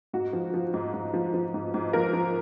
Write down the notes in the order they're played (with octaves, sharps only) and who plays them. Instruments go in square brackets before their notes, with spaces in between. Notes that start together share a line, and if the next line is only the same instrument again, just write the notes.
[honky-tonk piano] G#2 F#4
F3
F3
G#2
G#2
F3
F3
G#2
G#2
F3 A#4
F3